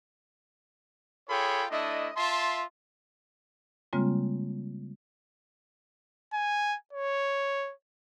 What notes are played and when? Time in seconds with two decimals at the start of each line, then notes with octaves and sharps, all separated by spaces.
1.30 F4 G#4 A4 C#5 G5 B5
1.71 A3 D4 E4 D#5
2.17 F4 E5 A5 C6
3.93 C#3 G3 G#3 A#3 C4 F4
6.33 G#5
6.93 C#5